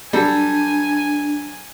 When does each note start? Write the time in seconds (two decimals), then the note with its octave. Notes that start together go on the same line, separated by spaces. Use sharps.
0.13 F#3 G3 D4 A4 G#5